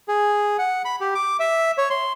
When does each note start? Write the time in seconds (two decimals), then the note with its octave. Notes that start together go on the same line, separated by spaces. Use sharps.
0.08 G#4
0.59 F#5
0.85 B5
1.01 G4
1.15 D6
1.40 E5
1.78 C#5
1.90 C6